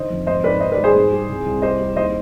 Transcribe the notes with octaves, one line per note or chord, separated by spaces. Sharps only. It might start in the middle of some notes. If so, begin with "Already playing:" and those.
Already playing: D3 D#3 C5 D#5
F2
G#2 C5 D#5
G#2 B4 D5
D#3 C5 D#5
B4 D5
G3
G#4 C5
G#2
G3
C2
C2
G3 C5 D#5
G3
D#2 C5 D#5